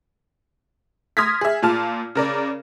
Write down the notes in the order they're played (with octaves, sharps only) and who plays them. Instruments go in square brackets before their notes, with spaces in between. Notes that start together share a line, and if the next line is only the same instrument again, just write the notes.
[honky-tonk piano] C6 D#6 F6 G#6 A#6 B6
G#4 E5
A#2 F4 A5 F6
C#3 A#4 D5